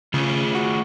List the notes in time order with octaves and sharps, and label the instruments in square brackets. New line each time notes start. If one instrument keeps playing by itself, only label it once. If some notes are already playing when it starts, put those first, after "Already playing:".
[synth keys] C#3 [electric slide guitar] A3 F4 G#4
[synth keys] F#4